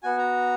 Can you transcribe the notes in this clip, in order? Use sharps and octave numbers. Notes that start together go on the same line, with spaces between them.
B3 F#4 G#5
A#5